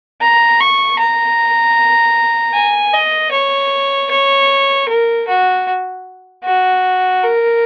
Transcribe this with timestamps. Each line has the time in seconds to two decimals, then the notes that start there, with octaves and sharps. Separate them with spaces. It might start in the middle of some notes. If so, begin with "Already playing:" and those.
0.21 A#5
0.59 C#6
0.98 A#5
2.54 G#5
2.94 D#5
3.32 C#5
4.11 C#5
4.89 A#4
5.28 F#4
6.44 F#4
7.23 A#4